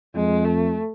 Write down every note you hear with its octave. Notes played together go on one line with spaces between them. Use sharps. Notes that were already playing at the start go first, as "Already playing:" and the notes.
F2 G#3
A3